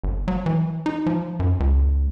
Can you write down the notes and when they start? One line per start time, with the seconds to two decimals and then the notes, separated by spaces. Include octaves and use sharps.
0.04 G1
0.28 F#3
0.46 E3
0.86 D#4
1.06 F3
1.40 F#2
1.60 C#2